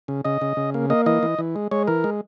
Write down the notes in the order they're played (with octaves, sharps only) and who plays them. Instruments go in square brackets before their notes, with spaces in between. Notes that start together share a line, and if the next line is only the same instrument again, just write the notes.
[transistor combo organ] C#3
C#3 D#5
C#3
C#3
A#3
A#3 D#5
E3 D#5
E3
E3
G#3
G#3 C#5
E3 A#4
G#3